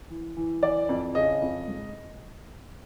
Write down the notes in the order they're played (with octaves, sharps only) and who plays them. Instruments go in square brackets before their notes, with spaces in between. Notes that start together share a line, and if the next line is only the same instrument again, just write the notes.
[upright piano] E3
E3
E3 D5
F2
C#3 D#5
F2
G#2